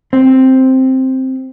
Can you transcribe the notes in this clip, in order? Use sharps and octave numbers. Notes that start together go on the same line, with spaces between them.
C4